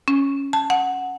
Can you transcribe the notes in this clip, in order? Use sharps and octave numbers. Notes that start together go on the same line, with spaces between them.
C#4
A5
F#5